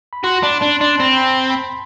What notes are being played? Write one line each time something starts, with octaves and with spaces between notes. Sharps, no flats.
B5
F#4 C6
D4 B5
D4
D4 C6
C4 B5
B5
A5
B5